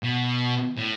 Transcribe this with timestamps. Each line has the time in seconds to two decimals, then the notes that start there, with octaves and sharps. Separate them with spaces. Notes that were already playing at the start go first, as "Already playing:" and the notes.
0.04 B2
0.77 A2